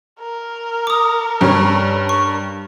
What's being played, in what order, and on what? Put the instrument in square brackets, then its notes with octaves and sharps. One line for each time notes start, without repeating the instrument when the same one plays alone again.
[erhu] A#4
[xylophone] D6 D#6
[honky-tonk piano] G2 [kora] G3 C#4
[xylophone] C#6